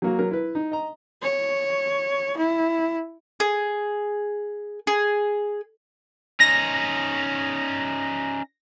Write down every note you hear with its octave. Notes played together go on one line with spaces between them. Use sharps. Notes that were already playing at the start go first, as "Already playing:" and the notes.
F#3 A#3 F#4
F#3 A#4
E4 B4
D#4
D#5 A#5
C#5
E4
G#4
G#4
C#4 D#4 A#6